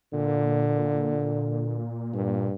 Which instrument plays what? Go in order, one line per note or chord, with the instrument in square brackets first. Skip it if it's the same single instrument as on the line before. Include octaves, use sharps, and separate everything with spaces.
[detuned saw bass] A#2 [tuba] D3
[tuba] G2